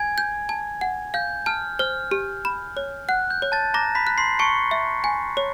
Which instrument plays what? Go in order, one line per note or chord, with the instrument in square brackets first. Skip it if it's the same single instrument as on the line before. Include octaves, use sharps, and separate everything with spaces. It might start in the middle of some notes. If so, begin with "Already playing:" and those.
Already playing: [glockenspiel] G#5 G#6
[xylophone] G6
A5
F#5
[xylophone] F5 [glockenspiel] G6
[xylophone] A5 [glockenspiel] F6
[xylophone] C5 [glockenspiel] F6
[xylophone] G4
B5
C#5
[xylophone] F#5 [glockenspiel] F#6
[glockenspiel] G6
[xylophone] C#5
[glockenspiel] A5 A6
[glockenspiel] A#5 A#6 [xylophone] D6
[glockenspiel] B5 B6
[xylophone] F#6
[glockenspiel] C6 C7
[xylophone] A5 [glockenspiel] C#6 C#7
[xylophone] E5
G#5
C#5